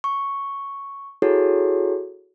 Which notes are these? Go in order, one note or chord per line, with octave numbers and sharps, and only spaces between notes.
C#6
E4 F#4 G#4 A4 C#5